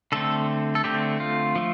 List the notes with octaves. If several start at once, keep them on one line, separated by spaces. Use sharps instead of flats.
D3 A3 C4 A4
A4
D3 A3 C4 G4
F4
F3 A3